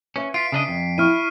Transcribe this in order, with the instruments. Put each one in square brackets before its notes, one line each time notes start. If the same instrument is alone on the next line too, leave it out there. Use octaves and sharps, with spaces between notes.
[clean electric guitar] C#4 [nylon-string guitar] B4 E5
[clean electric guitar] F4 [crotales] B6 C7 D7
[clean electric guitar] C#3 D4 D#5
F2
[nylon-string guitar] E4 [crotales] C#6 F6 D#7